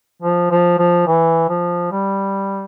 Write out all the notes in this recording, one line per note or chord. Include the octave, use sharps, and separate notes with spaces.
F3
F3
F3
E3
F3
G3